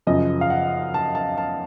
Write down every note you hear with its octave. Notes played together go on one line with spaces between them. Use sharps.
F#2 C#3 F3 D#5
F5
F#5
A5
A5
A5